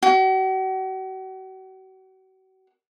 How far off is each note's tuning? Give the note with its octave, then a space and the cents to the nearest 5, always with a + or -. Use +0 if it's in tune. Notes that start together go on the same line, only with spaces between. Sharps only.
F#4 +40